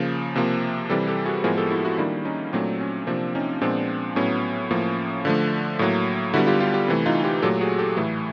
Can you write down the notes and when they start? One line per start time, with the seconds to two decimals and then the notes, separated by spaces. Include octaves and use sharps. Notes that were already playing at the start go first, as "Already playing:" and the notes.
Already playing: C#3 F3 A#3
0.36 C3 F3 A#3
0.89 C3 E3 G3 G4 A4
1.07 G4 A4
1.26 F#4 G#4
1.44 A2 F3 G#3 B3 G#4 A#4
1.57 G4 A4
1.71 E4 F#4
1.85 E4 F#4
1.98 D#3 G3 A#3 D4 E4
2.25 C#4 D#4
2.53 A#2 F#3 A3 C4 D4
2.81 C#4
3.07 C3 F3 A#3 C4 D4
3.35 C#4 D#4
3.61 A#2 F3 G#3 B3 C4 D4
4.16 A2 F#3 B3 C#4
4.70 A2 F3 A#3
5.25 D3 F3 A3
5.79 A2 F#3 A#3
6.34 D3 G3 B3 E4 F#4
6.47 F4 G4
6.60 F4 G4
6.74 F4 G4
6.88 C3 E3 A3
7.06 D#4 F4
7.24 F4 G4
7.42 A#2 F#3 A3 G4 A4
7.61 F#4 G#4
7.78 G4 A4
7.97 A2 E3 A3